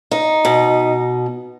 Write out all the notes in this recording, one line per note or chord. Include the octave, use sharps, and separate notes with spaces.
D#4
B2